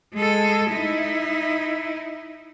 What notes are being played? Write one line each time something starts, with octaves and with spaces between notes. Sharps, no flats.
G#3 A4
D#4 E4